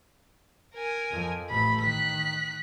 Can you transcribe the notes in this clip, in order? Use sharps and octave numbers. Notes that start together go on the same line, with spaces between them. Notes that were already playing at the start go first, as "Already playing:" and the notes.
A#4 G#5
F2 F3
A1 A3 B5
D#3 F#6 B6